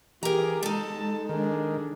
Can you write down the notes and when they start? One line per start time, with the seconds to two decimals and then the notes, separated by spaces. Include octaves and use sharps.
0.23 E3 G4 G#4 A#4 A#5
0.63 G#3 D#4 A4 A5
1.29 D#3 D4 G#4